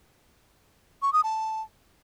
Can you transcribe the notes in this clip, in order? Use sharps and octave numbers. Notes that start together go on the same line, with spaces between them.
C#6
D#6
A5